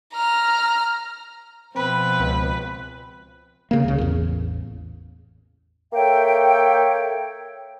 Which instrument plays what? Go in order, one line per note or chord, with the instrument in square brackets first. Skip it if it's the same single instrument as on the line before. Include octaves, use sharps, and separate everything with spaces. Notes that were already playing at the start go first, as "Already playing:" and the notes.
[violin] A#5 F6
[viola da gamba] B2 F3 [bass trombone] C4 [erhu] B4
[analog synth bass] C#2
[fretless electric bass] C#3 A#3
C#2 C#3
A1 E2
[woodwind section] A#3 A4 C#5 E5 G5